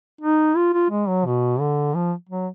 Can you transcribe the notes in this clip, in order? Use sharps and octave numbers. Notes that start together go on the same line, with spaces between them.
D#4
F4
F4
G#3
F#3
B2
D3
F3
F#3